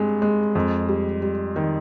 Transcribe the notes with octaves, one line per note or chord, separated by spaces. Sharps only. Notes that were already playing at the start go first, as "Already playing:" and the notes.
Already playing: G2 G#3 C4
G#3
F2
G3
G3
D#3